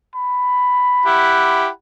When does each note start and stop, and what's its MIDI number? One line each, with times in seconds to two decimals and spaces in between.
0.15 1.72 83
1.06 1.68 64
1.06 1.68 67
1.06 1.68 78